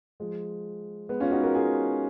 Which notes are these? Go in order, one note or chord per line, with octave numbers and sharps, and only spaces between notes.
F3 G#3
G#3 B3
C#4 F4
D#4 F#4
F#4 A#4
F4 G#4